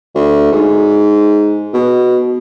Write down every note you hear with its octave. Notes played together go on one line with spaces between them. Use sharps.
D2
G#2
B2